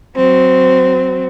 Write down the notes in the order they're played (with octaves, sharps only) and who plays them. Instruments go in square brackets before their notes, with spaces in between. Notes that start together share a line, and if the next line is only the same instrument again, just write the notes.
[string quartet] F#3 C4